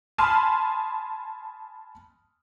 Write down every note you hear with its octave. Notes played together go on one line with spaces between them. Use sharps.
G#5 A5 B5 C6 F6